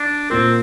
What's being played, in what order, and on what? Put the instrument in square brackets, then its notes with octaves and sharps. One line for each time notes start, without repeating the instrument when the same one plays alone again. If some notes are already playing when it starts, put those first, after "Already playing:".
Already playing: [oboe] D4
[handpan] A#2 A#3 F4 A#4 [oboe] C4